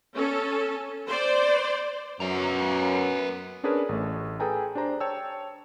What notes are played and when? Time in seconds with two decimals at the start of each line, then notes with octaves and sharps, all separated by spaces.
0.14 C#4 A4
1.06 C5 D5
2.20 F#2 B3 A#5
3.63 C#4 D4 G#4 A#4 B4 C#5
3.89 A1 A3
4.40 G#4 A4 B4 G5 G#5 A#5
4.75 D4 G4 C5 A#5
5.00 C#5 G5 A5 E6